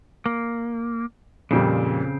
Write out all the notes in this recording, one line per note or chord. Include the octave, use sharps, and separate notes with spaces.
A#3
F2 A#2 C#3 G3 C4